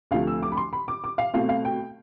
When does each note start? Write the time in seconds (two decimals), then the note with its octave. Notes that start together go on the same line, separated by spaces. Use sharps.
0.11 D2 C3 F3 A3 F5
0.27 E6
0.43 D6
0.52 B5
0.57 C6
0.73 B5
0.88 D6
1.04 D6
1.18 F5
1.33 B2 A3 C4 F5
1.49 F5
1.65 G5